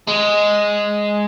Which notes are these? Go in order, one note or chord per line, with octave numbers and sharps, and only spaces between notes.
G#3